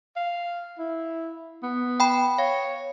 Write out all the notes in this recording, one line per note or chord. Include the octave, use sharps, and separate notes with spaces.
F5
E4
B3
G5 B5
C#5 F5